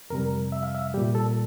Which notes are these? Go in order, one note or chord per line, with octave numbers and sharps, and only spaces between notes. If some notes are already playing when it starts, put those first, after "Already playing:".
F2 C3 G3 A#4
E5
F5
E5
A#2 G3 G4
A4